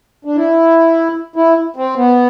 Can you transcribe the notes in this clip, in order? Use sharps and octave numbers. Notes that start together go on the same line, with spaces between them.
D4
E4
E4
C4
B3